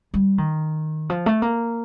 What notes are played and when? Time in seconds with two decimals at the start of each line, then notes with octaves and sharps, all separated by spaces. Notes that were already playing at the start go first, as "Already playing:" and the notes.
0.14 G3
0.38 D#3
1.10 F3
1.26 A3
1.42 A#3